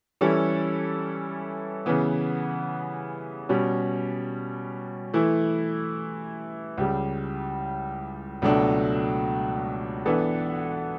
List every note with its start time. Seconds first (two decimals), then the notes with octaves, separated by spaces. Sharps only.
0.21 E3 G3 C#4 E4 A4
1.86 C#3 E3 B3
3.49 B2 G3 C#4
5.14 E3 A3 E4
6.78 C#2 C#3 G3
8.42 C#2 B2 F#3 A3 D4
10.06 E3 B3 D4 A4